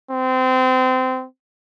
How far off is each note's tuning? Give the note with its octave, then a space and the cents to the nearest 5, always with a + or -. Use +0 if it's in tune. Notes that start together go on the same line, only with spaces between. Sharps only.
C4 -25